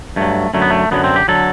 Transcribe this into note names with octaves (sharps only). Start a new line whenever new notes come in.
G2 F#3 A3
F#2 D3 F#3 A3
B3
A3
F#2 D3 F#3 B3
C4
G4
D3 F#3 A4